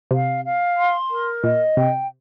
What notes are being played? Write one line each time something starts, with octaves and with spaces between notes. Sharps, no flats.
C3 F5
F5
C6
A#4
A#2 D#5
C3 G5